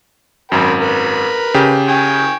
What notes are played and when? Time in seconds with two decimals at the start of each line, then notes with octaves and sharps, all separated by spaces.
0.52 G#1 F#2 A#4 G5 B5
0.79 A#4 B4
1.54 C#3 G4
1.88 G5 G#5 C#6